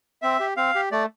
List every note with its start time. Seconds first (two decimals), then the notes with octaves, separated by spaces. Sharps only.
0.22 C4 E5
0.40 G4
0.57 C4 F5
0.75 G4
0.91 A3 D5